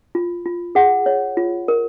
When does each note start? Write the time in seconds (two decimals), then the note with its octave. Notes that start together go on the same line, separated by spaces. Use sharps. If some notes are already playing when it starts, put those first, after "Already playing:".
0.15 F4
0.46 F4
0.75 G#4 F#5
1.06 C#5
1.37 F4
1.68 A#4